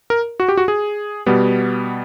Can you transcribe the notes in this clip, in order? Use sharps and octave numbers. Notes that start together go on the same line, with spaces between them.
A#4
F#4
G4
F#4
G#4
B2 G3 B3